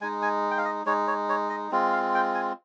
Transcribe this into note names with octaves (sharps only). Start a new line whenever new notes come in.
G#3 D#4 G#5
G#5
G5
F5
D#5
G#3 D#4 C#5
C#5
C#5
D#5
G#3 C4 F4
F5
G5
G#5